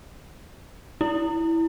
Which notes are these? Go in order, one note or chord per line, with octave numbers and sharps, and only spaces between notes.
E4